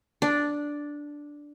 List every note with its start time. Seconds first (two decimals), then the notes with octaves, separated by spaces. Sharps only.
0.22 D4